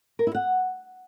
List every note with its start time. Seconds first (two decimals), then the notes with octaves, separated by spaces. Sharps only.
0.19 A#4
0.27 E4
0.35 F#5